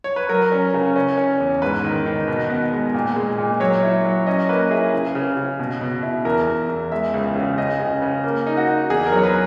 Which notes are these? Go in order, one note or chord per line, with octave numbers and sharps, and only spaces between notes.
C#5
B4
F#3 A#4
C#4
C#3
C#4
C#4
E2
G#2 B4
D#3
D#3
B2
B3
G#3
A#2
G#3
A#2
F#3 C#5
E4
F#3
C#4 D#5
A#3 B4
E4 G#4
C#3
C#3
C#3
B2
B2
E4
E2 A#4
E2
E2
G#3 E5
C#2
C#3
C#3 D#5
C#3
C#3
A#3
D#4
F#4
D#4
E2 G#4
A#4
F#3
C#5
B4